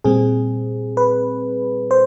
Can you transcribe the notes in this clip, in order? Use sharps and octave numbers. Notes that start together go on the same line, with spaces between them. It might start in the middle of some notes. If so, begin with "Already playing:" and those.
A#2 G3 C4 G#4
B4
C5